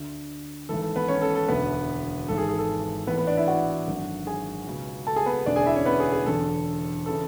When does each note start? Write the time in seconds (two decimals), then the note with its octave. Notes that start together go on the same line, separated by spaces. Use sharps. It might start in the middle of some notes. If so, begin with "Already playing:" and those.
Already playing: D2 D3
0.69 G#1 G#2 E3 A4
0.82 A4
0.96 B3 B4
1.08 C#4 C#5
1.22 A4
1.35 A4
1.48 E1 D2 D3 B3 B4
2.28 G#1 G#2 E3 A4
2.38 G#4
2.49 G#4
2.58 A4
3.07 A1 A2 E3 B3 B4
3.17 B3 B4
3.27 D4 D5
3.37 E4 E5
3.47 F#4 F#5
3.87 G#1 F#2 D3
4.27 G#4 G#5
4.67 C#2 B2
5.07 A4 A5
5.16 G#4 G#5
5.26 B3 B4
5.46 E1 D2 D3 D4 D5
5.56 G#4 G#5
5.66 E4 E5
5.76 C#4 C#5
5.86 B3 B4
6.00 G#4
6.12 G#4
6.26 E1 E2 D3 A4
7.06 C#3 E3 A4